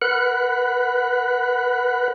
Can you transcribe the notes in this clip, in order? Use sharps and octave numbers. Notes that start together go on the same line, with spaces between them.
A#4 B4 F#5 B5 F#6